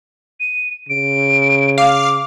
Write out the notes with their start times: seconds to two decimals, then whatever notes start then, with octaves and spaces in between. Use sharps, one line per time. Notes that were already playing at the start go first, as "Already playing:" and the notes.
0.40 D#7
0.89 C#3 D7
1.78 F5 D6